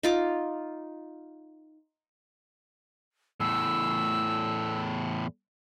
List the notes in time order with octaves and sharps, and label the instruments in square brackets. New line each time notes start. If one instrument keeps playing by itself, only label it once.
[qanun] D#4 F4 D6
[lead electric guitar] E2 A2 [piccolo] E6